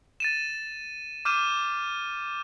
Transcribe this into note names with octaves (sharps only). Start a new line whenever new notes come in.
A6 D#7 E7
D6 F6 G6 D#7 E7